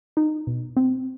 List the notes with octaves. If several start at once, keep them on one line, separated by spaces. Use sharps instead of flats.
D#4
B2
C4